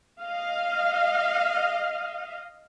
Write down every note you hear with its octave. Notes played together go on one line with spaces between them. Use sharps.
D#5 F5